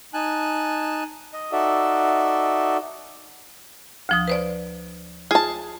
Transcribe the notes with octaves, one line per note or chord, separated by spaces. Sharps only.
D#4 G#5 A5 F#6
D#5
D#4 F#4 A4 D5 E5
D2 F3 D#6
B4 C5 D5
F4 G#4 A5